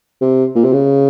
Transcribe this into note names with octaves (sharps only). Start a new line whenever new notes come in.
C3
A#2
C3
C#3